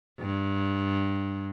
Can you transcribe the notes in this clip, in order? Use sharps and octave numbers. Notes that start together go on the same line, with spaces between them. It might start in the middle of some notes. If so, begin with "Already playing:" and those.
G2